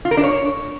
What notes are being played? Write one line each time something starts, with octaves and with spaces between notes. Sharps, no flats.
F4
A#4
D4
C#5